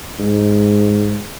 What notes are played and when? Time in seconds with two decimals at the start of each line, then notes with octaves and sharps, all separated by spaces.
0.19 G#2